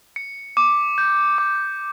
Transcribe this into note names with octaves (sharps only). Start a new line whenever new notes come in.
C#7
D6
G6
D6